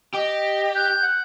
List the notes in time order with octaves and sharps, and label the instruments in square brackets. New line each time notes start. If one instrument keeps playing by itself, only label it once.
[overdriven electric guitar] G4 [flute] D#5
[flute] F#6 [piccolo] G6
[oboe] F#5